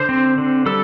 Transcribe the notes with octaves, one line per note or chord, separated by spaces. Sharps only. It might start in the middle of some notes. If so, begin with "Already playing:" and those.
Already playing: D3 C5
C4
D3
G3 A4